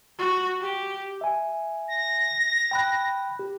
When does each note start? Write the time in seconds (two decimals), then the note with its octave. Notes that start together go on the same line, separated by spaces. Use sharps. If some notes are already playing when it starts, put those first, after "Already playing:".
0.18 F#4
0.61 G4
1.21 E5 G#5
1.89 A#6
2.71 G5 B5 F#6
3.39 G4